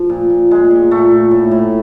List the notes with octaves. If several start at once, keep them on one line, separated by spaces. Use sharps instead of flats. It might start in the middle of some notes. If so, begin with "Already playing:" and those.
Already playing: F3
A#2
A#2
A#2 G#3
A#2
A#2 A3
A#2
A2
A2